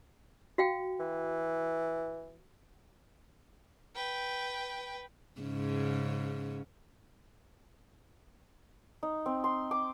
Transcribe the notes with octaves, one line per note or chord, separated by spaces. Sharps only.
F#4 F5 G5
E3
B4 G5
G#2 C#3 C#4
D#4
C4
C6
D6